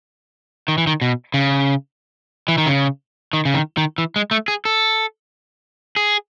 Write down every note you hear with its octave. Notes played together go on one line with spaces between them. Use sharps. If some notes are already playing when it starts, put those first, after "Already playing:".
D#3
E3
D#3
B2
C#3
E3
D#3
C#3
D#3
C#3
D#3
D#3
E3
G#3
A3
G#4
A4
G#4